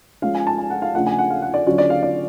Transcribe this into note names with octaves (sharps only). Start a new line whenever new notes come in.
F3 G#3 C#4 F5
G#5
A5
G#5
F#5
F5
C#3 F3 A3 D4 F4 F#5
G#5
F#5
F5
F#5
D5
D3 F#3 C#4 F4 D5
D5
F5
D5